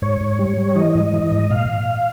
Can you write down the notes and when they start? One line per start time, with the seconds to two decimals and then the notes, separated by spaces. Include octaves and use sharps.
0.02 G#2 C#5
0.21 G#2
0.39 G3
0.58 G3
0.76 E3 D#5
0.95 G#2
1.14 E3
1.32 G#2
1.50 A#2 F5